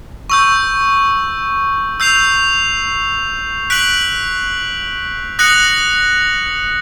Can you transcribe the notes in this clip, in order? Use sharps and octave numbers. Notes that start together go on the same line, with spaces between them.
C#6 E6 G6
E6 G6 C7 F7
F#6 B6 D7 F#7
D#6 F#6 A#6 C#7 F#7